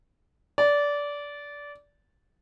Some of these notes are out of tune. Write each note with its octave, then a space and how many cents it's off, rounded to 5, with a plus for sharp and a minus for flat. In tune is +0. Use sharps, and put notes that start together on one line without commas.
D5 -20